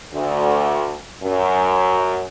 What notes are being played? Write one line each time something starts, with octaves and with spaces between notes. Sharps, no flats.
D2
F#2